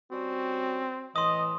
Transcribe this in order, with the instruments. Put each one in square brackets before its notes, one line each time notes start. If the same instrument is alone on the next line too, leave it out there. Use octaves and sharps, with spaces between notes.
[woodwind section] G3 C#4 F#4 [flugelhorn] C4
[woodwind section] A2 E3 [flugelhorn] D#5 [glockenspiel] C6 D#6